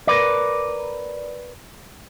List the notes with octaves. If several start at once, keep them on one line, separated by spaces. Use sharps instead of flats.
A#4 B4 D5